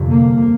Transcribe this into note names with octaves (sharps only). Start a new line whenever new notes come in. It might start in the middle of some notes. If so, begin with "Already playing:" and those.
Already playing: G1 F2 C3
A#3